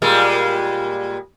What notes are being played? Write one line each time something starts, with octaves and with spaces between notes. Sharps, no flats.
A#2 G3 G#3